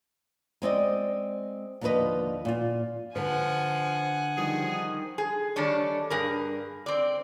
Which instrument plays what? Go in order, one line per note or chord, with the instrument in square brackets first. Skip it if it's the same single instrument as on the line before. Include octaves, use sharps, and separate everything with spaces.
[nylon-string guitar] G#3 C4 D5 D#5
D#2 D3 F3 A4 B4 D#5
A#2 F4
[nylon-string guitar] D3 B4 [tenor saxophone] F3 [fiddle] F#5 G#5
[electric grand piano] D#3 F3 G3 [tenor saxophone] G#4
[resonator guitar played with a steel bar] G#4
D#3 G3 A3 D4 C#5
G2 G#4 A#4
C4 D5